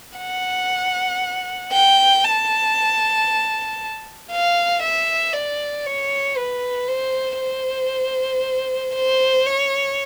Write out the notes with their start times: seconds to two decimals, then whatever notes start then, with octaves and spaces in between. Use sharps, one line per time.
0.18 F#5
1.72 G5
2.24 A5
4.31 F5
4.83 E5
5.33 D5
5.86 C#5
6.37 B4
6.88 C5
7.40 C5
8.95 C5
9.46 C#5